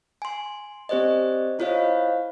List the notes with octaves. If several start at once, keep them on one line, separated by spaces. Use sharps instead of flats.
G#5 C6
C4 G4 C5 D5 D#5
E4 F4 C5 C#5 D#5 F5